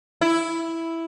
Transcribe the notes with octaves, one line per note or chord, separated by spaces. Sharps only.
E4